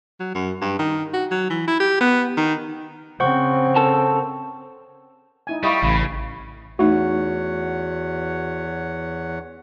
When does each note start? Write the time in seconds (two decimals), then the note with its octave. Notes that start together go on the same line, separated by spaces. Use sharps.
0.20 F#3
0.35 F#2
0.61 G2
0.79 D#3
1.14 F#4
1.31 F#3
1.50 E3
1.67 E4
1.80 G4
2.01 B3
2.37 D#3
3.20 C#3 C4 C5 F#5 C#6
3.76 A4 A#4 A5
5.47 D#4 E4 G#5
5.63 G3 E4 G4 D#5 F5 B5 C#6
5.82 A1 C#3
6.79 E2 A3 D#4 F#4 C#5 F#5